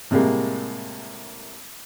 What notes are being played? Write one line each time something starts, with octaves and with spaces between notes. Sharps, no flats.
A2 C3 G3 G#3 A#3